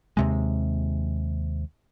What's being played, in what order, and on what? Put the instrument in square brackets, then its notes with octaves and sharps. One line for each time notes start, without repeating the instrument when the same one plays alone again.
[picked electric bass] D#2 C3 G#3